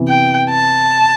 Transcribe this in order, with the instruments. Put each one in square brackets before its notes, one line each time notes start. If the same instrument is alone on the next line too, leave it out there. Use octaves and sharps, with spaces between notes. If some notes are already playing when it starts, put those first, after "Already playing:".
Already playing: [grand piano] C3 E3 B3
[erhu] G5
A5